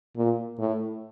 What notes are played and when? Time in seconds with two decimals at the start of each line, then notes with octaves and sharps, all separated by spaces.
0.17 A#2
0.59 A2